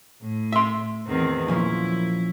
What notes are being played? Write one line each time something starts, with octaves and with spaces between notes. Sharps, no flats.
A2
E5 C6
E2 D#3 C4
A#2 F3 C#4 E4